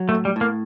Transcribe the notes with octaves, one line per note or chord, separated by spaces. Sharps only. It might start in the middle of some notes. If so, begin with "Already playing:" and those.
Already playing: F#3
A3
A2
G3
A2
A#3